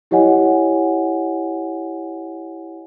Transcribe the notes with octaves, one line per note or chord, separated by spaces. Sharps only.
E4 G4 C#5 D#5 F#5 G#5